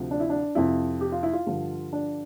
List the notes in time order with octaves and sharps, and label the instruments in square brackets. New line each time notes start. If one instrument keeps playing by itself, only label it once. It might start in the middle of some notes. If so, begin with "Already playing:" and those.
Already playing: [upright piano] D2 C3 F3
D4
E4
D4
F2 C3 F3 E4
G4
F4
E4
F4
G2 D3 F3
D4